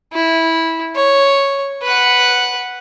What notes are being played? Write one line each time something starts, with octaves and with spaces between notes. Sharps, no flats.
E4
C#5
B4 F#5